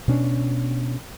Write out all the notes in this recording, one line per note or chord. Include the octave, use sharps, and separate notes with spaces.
B2 C#4 D4